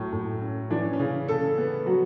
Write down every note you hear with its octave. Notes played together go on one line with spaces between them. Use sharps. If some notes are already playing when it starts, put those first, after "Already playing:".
Already playing: A2 F#3
A2
C#4
E3 D4
C#4
C#4
C#3
C#3 A4
B3
F#3 F#4